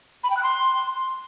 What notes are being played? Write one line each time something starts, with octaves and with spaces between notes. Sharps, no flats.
B5
G5
F#6
C6